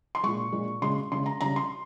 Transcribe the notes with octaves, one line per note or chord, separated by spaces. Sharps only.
C6
A#2 G#3 C#6
A#2 G#3
C#3 G#3 C6
C#3 G#3 C6
A#5
C#3 G3 A#5
C6